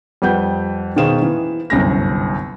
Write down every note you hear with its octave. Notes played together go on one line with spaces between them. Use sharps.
F2 G3 B4 F#5 G6
B2 D#3 G#4 C5 F5 E7
E3
G1 C2 F#2 A#6